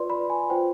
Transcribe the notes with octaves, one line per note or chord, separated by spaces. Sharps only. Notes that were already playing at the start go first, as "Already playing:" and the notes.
Already playing: F4 B4 D5 C6
B5
G#5
F4 C5 G5